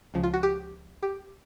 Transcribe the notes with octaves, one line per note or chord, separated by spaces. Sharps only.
C#2 C#3 F3
F4
F#4
G4
G4